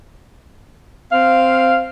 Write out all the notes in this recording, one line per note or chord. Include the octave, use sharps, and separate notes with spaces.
C4 F5